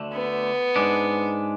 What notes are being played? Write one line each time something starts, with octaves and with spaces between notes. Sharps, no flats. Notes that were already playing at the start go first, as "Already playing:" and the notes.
Already playing: D2 D3 A3
B3
G#2 G#3 D4